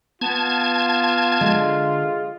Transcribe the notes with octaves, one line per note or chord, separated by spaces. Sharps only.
B3 F4 A5 G#6
D3 G#3